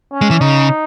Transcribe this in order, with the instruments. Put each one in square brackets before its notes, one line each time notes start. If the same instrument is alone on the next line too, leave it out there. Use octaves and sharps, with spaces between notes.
[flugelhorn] C#4
[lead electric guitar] G#3
E3
[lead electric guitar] C#3 [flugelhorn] D#4